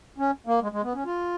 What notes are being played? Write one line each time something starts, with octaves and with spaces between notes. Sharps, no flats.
C#4
A#3
G#3
G#3
B3
C#4
F4